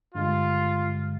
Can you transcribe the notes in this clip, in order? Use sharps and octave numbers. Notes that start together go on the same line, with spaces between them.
G2 D3 G#3 F4